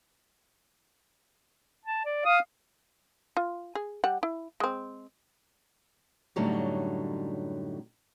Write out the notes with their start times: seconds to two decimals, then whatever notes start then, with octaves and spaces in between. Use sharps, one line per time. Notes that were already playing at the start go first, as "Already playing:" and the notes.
1.85 A5
2.05 D5
2.25 F5 D#6
3.37 F4
3.75 G#4
4.04 G3 G4 F#5
4.23 E4
4.60 G#3 C4
6.36 F#2 A2 D3 F#3 G3 D#4